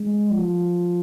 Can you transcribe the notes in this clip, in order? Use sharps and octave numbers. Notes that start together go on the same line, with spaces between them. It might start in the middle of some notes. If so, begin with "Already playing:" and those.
Already playing: G#3
F3